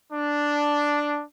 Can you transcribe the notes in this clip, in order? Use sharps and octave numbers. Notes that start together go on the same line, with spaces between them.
D4